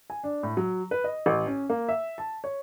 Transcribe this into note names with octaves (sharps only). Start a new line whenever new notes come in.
G#5
D4
A2
F#3
B4
D#5
A1
C#4
A#3
E5
A5
C#5